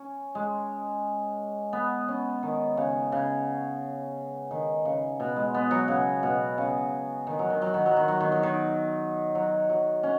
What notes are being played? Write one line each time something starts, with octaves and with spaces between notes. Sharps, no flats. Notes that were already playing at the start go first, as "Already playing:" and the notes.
Already playing: C#4
G#3
B3
C#4
D#3
C#3
C#3
D#3
C#3
B2
G#3
B3
F#3
C#3
B2
C#3
D#3
F#3
D#3
F#3
D#3
F#3
D#3
F#3
D#3
F#3
D#3
F#3
F#3
C#4